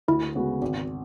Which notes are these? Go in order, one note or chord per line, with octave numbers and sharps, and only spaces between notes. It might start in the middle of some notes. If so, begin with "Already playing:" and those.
D2 E4
C#3 G#3 B3 F#4
G#1